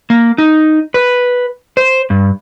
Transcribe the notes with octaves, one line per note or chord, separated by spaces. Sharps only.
A#3
D#4
B4
C5
G2